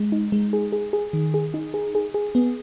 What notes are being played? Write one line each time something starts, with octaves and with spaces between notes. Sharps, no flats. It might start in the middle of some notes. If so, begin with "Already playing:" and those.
Already playing: G#3
D#4
G#3
G#4
G#4
G#4
D#3
G#4
D#4
G#4
G#4
G#4
B3